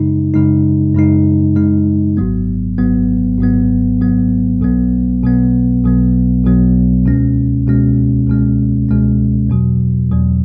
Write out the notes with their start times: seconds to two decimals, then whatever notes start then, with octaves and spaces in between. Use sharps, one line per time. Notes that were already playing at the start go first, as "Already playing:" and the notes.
Already playing: F#2 C#3 G#3 D#4
0.34 F#2 C#3 G#3 D#4
0.95 F#2 C#3 G#3 D#4
1.56 F#2 C#3 G#3 D#4
2.17 G#1 G#2 F#3 B3
2.78 G#1 G#2 F#3 B3
3.39 G#1 G#2 F#3 B3
4.00 G#1 G#2 F#3 B3
4.61 B1 B2 F#3 B3
5.22 B1 B2 F#3 B3
5.84 B1 B2 F#3 B3
6.45 B1 B2 F#3 B3
7.06 C#2 B2 G#3 C#4
7.66 C#2 B2 G#3 C#4
8.28 C#2 B2 G#3 C#4
8.89 C#2 B2 G#3 C#4
9.50 E2 B2 F#3
10.11 E2 B2 F#3